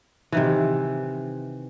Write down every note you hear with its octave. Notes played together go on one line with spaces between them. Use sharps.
C3 D#3 E3